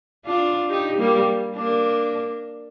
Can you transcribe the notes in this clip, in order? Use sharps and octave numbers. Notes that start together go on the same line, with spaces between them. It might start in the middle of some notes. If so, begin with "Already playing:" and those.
D4 F4
D#4 G4
G3 A#3
A#3 D4